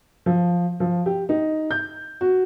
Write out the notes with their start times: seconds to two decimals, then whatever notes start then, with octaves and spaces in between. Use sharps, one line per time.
0.26 F3
0.80 F3
1.06 G4
1.29 D#4
1.71 G6
2.21 F#4